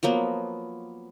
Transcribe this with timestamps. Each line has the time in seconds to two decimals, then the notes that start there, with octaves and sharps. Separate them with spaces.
0.03 F3 F#3 A#3 B3